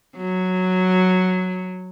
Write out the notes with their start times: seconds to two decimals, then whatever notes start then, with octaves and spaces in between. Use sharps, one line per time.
0.16 F#3